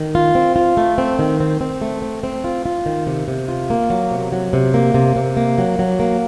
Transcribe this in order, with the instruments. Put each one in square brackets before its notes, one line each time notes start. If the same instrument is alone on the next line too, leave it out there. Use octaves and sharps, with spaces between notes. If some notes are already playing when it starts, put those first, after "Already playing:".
Already playing: [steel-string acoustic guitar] D#3
F4
C4
F4
A3
C4
D#3
C4
C4
A3
C4
C4
F4
F4
D#3
C3
C3
F4
A#3
F#3
C3
F#3
C3
A#3
C3
C3
A#3
F#3
F#3
A#3